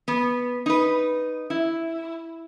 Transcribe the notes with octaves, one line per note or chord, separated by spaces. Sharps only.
B3
D#4 B4
E4